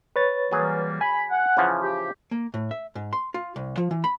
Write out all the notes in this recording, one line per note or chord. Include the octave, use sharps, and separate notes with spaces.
B4 C#5 A6
E3 F#3 G3 A#3 G#4
G#5 B5
F#5
C#3 E3 F3
G4
A#3
A2
E5
G#2
C6
F4
C2
F3
E3
B5